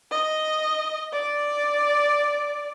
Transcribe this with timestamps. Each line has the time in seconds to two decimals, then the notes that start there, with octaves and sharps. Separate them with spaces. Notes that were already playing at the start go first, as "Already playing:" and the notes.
0.11 D#5
1.12 D5